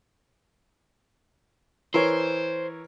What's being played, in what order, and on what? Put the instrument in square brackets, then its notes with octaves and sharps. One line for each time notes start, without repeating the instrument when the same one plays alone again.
[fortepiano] E3 A#4 C#5 [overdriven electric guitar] C5